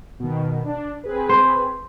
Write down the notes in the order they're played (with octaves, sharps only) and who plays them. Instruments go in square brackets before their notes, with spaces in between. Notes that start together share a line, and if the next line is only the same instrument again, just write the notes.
[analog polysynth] B2 D#3
D4
C4 G#4 B4
[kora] C5